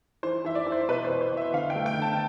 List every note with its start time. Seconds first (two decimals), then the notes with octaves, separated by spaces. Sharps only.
0.23 E3 C5
0.44 E3 E5
0.55 D5
0.66 E3
0.72 C5
0.88 B2 B4
1.05 C5
1.10 B2
1.21 C5
1.31 B2
1.37 E5
1.53 D3 F5
1.70 G5
1.75 A3
1.86 G5
1.97 D3
2.02 A5